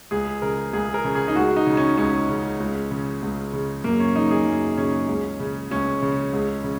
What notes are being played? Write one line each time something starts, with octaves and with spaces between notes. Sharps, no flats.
C#2 G#4
C#3 A#4
C#2 G#4
A#4
C#3
G#4
D#4
C#2 F#4
D#4
C#3
C#4
C#2 C#4
C#3
C#2
C#3
C#2
C#3
F#2 A#3
C#4
C#3 D#4
G#4
F#2
C#3 C#4
C#2
C#3
C#2 C#4
C#3
C#2
C#3